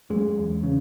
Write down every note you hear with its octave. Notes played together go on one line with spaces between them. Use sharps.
F#2 G#3
E2
C#3